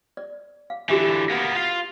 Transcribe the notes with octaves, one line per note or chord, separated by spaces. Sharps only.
D5
F5
D3 E3 F#4 G4 E5
A#3 B3
F4 F5